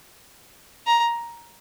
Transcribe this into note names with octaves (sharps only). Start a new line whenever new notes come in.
A#5